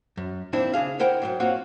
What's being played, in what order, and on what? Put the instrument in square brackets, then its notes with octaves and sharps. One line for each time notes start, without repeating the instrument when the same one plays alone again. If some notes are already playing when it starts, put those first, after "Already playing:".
[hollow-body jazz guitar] F#2
A#2 D#3 C4 D4 E4
C#3 D4 G#4 F5
E4 A#4 C5 F#5 G5
G#2 F#3 G5
A#3 C4 F4 F#4 C#5 F#5